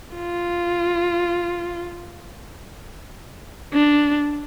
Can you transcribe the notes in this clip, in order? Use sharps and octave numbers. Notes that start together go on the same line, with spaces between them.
F4
D4